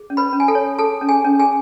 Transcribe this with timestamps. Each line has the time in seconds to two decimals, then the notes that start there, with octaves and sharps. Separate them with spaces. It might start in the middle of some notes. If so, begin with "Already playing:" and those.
Already playing: G#4
0.10 C#4
0.17 B4 B5
0.33 C#4
0.40 G#5
0.48 A4 A5
0.55 C#5
0.79 G#4 A4 A5
1.01 C#4
1.09 G#4 G#5
1.25 C#4
1.40 G#4 G#5